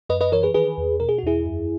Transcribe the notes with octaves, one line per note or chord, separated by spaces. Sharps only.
F#2 B4 D#5
B4 D#5
E3 A#4 C#5
G#4 B4
D#3 G#4 B4
E2
B2 A#4
G#4
F#4
E2 E4 G#4
F#2